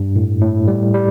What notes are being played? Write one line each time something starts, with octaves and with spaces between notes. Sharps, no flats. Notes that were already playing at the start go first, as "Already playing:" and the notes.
Already playing: G2
A2
A2
G3
G3